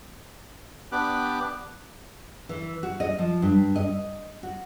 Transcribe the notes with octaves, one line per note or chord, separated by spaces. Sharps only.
B3 D4 G4 B4 D6 F#6
E3
F#4
D#5
F3
G2
D#5
F#4